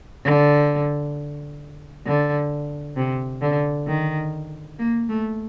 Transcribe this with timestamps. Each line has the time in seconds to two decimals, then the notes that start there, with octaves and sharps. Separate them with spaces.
0.24 D3
2.06 D3
2.96 C3
3.42 D3
3.87 D#3
4.79 A#3
5.09 A3